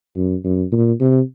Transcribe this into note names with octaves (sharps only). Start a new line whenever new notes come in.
F#2
F#2
A#2
C3